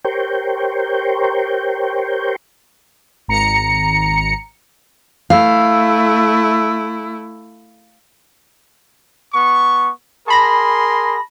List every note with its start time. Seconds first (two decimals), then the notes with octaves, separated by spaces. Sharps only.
0.05 G4 A#4 C5 C#5 G5
3.28 G#1 A#5 C#7
5.30 A3 E4 F5
9.34 B3 C#6
10.28 G#4 A#4 A5 B5 C6 A#6